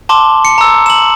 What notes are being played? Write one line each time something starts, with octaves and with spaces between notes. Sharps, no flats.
A5 C6 D6
C#7
A#5 E6
E7 F#7